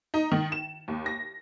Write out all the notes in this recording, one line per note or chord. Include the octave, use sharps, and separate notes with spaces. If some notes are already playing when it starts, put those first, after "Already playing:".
D#4
D#3
E7
D#2
A#6